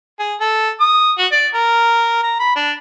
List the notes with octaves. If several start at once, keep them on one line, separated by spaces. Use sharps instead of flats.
G#4
A4
D#6
F#4
D5
A#4
A#5
B5
D4